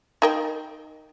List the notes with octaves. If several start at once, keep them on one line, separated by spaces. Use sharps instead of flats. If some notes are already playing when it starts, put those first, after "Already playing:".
D#4 A#4 G5